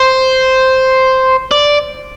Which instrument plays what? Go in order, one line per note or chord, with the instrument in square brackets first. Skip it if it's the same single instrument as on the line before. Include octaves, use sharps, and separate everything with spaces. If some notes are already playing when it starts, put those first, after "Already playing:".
Already playing: [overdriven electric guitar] C5
D5